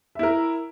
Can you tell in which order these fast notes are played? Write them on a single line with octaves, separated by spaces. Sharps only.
E5 E4 A#4